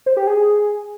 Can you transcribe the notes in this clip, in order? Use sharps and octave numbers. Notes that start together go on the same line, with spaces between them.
C5
G4
G#4